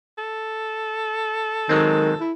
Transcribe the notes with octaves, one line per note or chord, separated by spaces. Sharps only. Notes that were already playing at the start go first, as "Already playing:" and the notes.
A4
D#3 F#3 G#3 C4
E4